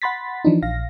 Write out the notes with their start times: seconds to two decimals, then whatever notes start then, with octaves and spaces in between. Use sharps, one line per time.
0.02 F#5 B5 C6 A6 B6
0.45 E3 F3 D4 D#4
0.62 A#1 F5 A#6